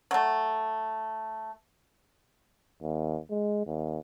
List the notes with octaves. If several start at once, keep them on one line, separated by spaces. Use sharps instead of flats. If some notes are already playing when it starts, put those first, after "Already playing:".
F#3 A3
D#2
G#3
D#2